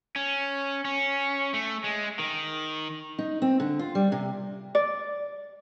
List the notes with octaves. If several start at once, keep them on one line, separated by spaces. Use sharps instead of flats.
C#4
C#4
A3
G#3
D#3
D#4
C4
D3
F4
G3
C3
D5